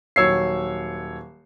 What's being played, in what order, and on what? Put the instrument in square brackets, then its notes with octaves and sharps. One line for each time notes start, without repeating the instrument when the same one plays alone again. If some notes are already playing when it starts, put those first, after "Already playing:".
[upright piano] D#1 F#3 C#5 E6 C7